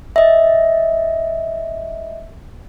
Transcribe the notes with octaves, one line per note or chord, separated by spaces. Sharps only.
D#5 E5